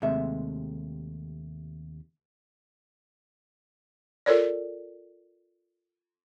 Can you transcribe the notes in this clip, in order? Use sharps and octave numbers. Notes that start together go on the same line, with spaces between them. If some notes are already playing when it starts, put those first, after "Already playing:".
D#2 C3 G#3 A3 E5
F4 A4 A#4 C#5 D5